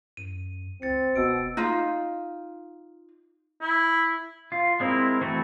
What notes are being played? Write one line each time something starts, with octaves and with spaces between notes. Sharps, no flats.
F#2 D#7
C#2 C4 A6 C#7
E1 B2 E6 D7
D#4 F4
E4
F4
G#3 C4 E4 A#4
E3 A3 C4 E4 F#4